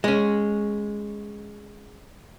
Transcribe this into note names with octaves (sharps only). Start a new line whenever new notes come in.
G#3 C#4